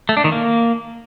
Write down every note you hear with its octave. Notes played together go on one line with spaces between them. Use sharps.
A3
D4
D#3
A#3